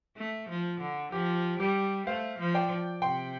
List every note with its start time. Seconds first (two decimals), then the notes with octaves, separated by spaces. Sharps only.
0.18 A3
0.50 F3
0.80 D3
1.12 F3 G4
1.59 G3 G4
2.07 A3 C5 F5
2.39 F3
2.54 D5 G5
3.02 C3 G5 C6